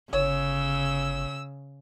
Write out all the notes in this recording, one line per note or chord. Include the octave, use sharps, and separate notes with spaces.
G1 C#3 C#5 E6